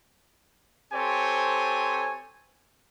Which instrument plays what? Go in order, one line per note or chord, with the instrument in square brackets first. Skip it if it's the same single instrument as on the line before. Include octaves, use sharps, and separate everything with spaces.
[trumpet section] C4 G4 A4 C5 C#5 G#5